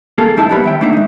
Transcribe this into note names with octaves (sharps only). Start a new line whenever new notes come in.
A#3 G#4 A4
G#2 F3 D#4 E4 E5 A5
G3 A#3 B3 C#5 B5
D#2 E5 G5
A3 A#3 D4 D#4 E5
G#3 D#4